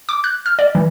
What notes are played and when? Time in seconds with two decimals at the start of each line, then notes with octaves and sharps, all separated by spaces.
0.09 D6
0.24 F#6
0.46 F6
0.59 D5
0.75 E3